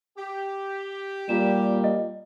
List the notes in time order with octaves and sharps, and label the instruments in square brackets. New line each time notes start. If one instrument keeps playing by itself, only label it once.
[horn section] G4
[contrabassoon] A#2 [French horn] G3 [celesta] E7
[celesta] D#5